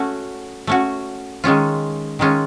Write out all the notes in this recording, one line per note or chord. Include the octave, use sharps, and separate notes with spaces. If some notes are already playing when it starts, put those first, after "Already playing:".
Already playing: A3 C#4 F#4
A3 C#4 F#4
D#3 G#3 C#4 F4
D#3 G#3 C#4 F4